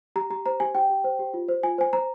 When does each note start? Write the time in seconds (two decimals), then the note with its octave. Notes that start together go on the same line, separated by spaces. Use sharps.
0.16 G4 A#5
0.30 G4 A#5
0.46 C5 A#5
0.60 G4 G#5
0.75 G4 G5
0.89 G4
1.04 C5
1.19 G4
1.34 F4
1.48 C5
1.63 F4 G#5
1.78 C5 G#5
1.93 C5 A#5